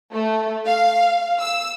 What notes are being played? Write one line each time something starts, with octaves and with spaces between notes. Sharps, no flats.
A3
F5
E6